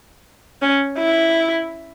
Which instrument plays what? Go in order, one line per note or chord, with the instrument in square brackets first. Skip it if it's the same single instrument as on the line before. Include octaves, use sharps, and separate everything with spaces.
[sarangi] C#4
E4